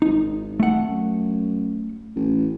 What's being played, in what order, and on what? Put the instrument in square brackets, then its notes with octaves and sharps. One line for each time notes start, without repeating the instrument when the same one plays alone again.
[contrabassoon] G#1 [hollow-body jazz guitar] D#4
[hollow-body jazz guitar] A3 F#5
[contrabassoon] F#2
A1